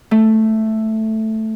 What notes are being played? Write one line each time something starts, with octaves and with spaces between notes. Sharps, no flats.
A3